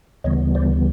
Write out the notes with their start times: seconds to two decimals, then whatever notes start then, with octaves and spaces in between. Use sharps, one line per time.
0.24 D2 C#3 E3 G3 B3 C#5 D#5
0.55 C5 D5